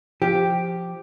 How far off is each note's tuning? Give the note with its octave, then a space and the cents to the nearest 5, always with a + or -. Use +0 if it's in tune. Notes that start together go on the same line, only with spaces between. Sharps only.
F3 +0 G4 +0